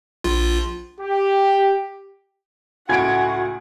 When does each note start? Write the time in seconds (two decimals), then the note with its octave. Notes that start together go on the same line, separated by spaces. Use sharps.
0.24 A#1 F4
1.00 G4
2.89 C#2 A2 F#4 F#5 G#5 B5 G#6 D7